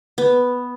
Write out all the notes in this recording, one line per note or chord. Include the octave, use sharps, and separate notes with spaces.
B3